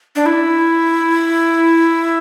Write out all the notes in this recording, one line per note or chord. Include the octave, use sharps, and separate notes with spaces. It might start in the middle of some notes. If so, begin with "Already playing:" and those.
D4
E4